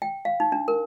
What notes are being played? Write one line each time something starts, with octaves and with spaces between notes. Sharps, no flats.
G5
F5
D#4
D4
A#4